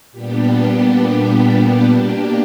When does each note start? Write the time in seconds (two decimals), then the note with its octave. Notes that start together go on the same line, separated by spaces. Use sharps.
0.12 A#2 G3 B3 D4 G4
1.88 B2 A#3 D4 G4